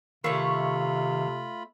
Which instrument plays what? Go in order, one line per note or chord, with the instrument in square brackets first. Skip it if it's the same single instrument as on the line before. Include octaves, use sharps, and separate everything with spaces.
[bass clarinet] C3 [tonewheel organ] D#3 F5 [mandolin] A3 C#5 [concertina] F4 B5